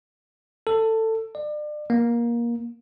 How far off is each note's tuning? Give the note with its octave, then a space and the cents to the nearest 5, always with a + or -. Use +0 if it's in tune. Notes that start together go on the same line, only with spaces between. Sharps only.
A4 +15
D5 +35
A#3 +20